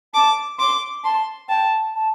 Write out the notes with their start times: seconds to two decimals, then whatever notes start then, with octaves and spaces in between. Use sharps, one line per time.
0.14 A5 D6
0.59 C6 D6
1.04 A5 C6
1.49 G5 A5
1.95 A5